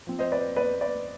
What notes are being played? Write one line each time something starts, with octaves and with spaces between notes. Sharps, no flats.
F3 C4
C5 D#5
B4 D5
B4 D5
B4 D5